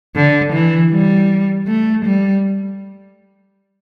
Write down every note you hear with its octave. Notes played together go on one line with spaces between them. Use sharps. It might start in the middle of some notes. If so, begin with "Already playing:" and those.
D3
E3
G3
A3
G3